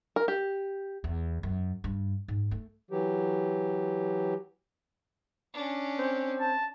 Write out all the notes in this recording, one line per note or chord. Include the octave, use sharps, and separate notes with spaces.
A#4
G4
E2
F#2
G2
G#2
A3
E3 F#3 G4
C#4 D4
C4
A5